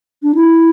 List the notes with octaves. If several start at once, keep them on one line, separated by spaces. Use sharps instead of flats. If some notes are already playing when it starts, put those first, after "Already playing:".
D4
E4